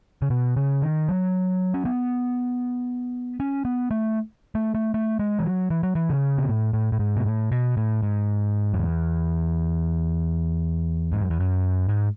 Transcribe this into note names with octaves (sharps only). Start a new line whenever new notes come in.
C#3
B2
C#3
D#3
F#3
C#4
B3
C#4
B3
A3
A3
A3
A3
G#3
E3
F#3
E3
F#3
E3
C#3
B2
A2
A2
A2
G#2
B2
A2
B2
A2
G#2
F#2
E2
G#2
F#2
E2
F#2
G#2